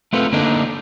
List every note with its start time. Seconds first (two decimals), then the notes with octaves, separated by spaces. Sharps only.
0.13 A3 B3 C4 F4 A4 B4
0.32 D3 A#3 D4 D#4 A4 D5